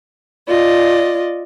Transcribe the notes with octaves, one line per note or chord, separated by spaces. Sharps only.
F4 D5 D#5